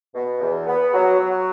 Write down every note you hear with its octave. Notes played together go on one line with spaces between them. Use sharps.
B2
E2
B3
F#3
F#3